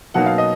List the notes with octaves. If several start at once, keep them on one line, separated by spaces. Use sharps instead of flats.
B2 F#3 A#3 D#4 F#5
F5
D#5